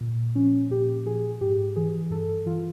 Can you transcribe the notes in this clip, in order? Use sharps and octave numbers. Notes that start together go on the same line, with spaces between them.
A#2
F3 C#4
A#2 G4
F3 G#4
G#2 G4
E3 G#4
G2 A4
E3 F4